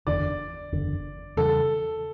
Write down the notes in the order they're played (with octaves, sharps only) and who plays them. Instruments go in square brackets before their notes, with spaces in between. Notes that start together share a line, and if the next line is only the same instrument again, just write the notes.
[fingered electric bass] F#1 E2 D3 [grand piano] D5
[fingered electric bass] F#1 E2 D3
[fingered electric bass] E2 C#3 E3 G3 [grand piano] A4